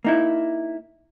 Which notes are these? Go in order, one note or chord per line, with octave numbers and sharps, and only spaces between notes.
A#3 D#4 E4